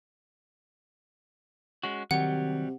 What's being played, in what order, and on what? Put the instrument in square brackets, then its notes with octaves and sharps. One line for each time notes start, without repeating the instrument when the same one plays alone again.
[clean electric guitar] G#3 C#4 F#4
[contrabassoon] C3 [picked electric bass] D#3 [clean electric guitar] F#3 G3 [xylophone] F#5